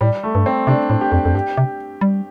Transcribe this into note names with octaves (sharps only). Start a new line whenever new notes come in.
A2 G3
A3
G2
C4
C3 D4
A2
G4
F2
F2
G2 G4
C3
G3